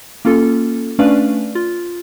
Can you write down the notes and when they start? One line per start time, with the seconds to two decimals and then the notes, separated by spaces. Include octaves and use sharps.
0.25 A#3 C#4 F4 A4
0.99 A3 C#4 D4 B4 D5 F5
1.55 F4